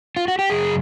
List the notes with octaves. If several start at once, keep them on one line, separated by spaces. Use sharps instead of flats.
F4
F#4
G4
F#2 C#3 G#4